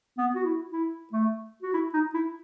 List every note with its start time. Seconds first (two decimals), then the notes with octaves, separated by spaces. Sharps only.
0.18 B3
0.36 F#4
0.45 E4
0.72 E4
1.13 A3
1.63 F#4
1.73 E4
1.94 D#4
2.14 E4